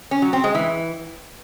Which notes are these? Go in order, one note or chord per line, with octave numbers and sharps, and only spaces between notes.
C#4
F#3
C4
G#3
E3